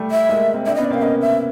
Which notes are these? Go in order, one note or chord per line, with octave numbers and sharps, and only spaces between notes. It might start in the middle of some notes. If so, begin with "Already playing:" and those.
Already playing: G3 A3
E5
G#3 A#3
A#3 C4
C4 D4 E5
D#5
B3 C#4
D5
A#3 C4
F5
B3 C#4 D#5
E5